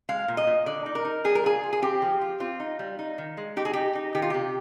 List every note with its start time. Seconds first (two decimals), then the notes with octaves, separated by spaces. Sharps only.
0.09 G#3 F5
0.28 A#2
0.37 D#5
0.47 A#2
0.66 D3 D5
0.86 D#4
0.95 A#4
1.05 D#4
1.24 G3 G#4
1.35 A#4
1.44 F4 G#4
1.63 F4
1.73 G#4
1.82 C4 G4
2.02 F3
2.21 F4
2.40 C4 F4
2.60 D#4
2.79 G3
2.99 D#4
3.18 D#3
3.37 G#3
3.56 D#4 G4
3.65 G#4
3.73 D#4 G4
3.95 D#4
4.15 D#3 G4
4.22 F4
4.30 C3 G4